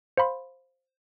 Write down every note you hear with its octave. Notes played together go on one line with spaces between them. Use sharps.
C5 F5 B5 C6